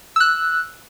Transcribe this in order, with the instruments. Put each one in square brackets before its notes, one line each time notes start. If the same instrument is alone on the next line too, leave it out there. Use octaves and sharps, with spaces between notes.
[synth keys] E6 F#6